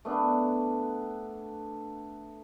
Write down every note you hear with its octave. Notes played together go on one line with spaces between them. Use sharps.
A3 B3 D4